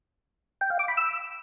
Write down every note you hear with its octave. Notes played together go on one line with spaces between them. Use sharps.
G5
F5
D6
B5
E6